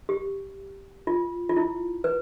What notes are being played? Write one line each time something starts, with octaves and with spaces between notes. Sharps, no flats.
G4
F4
F4
E4
B4